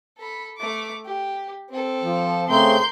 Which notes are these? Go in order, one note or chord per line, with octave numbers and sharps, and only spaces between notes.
A4 B5
A3 D6
G4
C4 A4
F3
C#3 A3 C4 A#4 C6 G6